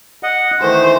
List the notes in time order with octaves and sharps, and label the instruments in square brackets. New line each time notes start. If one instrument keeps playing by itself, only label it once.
[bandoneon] D#5 F#5
[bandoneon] D#3 E3 A3 [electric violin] C5